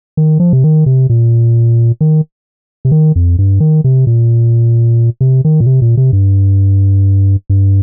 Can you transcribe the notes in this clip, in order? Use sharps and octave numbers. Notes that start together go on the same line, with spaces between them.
D#3
F3
C3
D#3
C3
A#2
D#3
C3
D#3
F2
G2
D#3
C3
A#2
C3
D#3
A#2
C3
A#2
C3
G2
G2